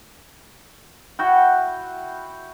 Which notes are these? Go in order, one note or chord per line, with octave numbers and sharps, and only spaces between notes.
E4 F#4 G5